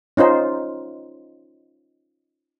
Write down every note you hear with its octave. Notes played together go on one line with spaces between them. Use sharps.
C#4 D#4 F4 C5